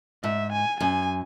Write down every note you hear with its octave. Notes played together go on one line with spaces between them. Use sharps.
G#2 E5
G#5
F#2 G#5